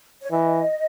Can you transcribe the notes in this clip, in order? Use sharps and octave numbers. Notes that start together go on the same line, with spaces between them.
C#5
E3 D#5